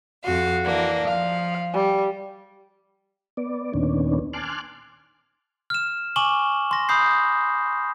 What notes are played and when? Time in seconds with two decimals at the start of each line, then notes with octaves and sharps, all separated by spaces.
0.24 F2 F#4 F5
0.64 E3 A#3 D4
1.07 F3 F5
1.74 G3
3.37 B3 D5
3.74 D#2 A#2 D#3 B3 C#4 D4
4.33 G#5 A5 C6 D6 F6 F#6
5.70 F6 E7
6.16 G#5 C#6 D6 E7 F#7 G7
6.71 C6 A#6
6.89 B5 D#6 G6 C7